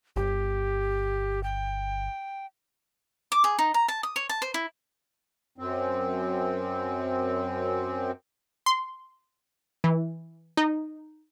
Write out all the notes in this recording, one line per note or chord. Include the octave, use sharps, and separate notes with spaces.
G1 G4
G5
D6
G#4
D#4
A#5
A5
D#6
C#5
A5
C5
E4
F#2 C4
C6
E3
D#4